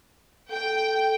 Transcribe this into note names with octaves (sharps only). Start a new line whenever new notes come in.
A4 G5